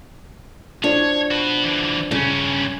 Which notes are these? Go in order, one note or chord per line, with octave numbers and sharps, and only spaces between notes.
F3 D4 C#5
F#4 B4
D3 E3
G2 C#3 C#4